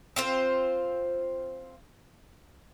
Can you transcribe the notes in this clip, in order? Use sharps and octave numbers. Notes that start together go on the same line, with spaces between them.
C4 F4 C5